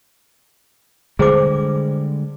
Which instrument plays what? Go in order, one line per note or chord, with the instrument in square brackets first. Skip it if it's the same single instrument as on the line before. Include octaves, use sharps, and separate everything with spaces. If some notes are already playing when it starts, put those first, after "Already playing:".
[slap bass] D3 G3 G#3 [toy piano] G#4 C5 D6